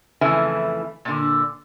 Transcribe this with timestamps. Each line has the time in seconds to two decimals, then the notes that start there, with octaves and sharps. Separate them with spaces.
0.21 F2 C#3 E3 A3 E4 G#5
1.05 A#2 D3